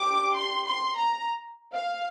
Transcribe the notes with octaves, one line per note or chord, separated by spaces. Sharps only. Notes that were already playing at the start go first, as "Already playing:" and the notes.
Already playing: D4 G4 D6
C6
C6
A#5
F5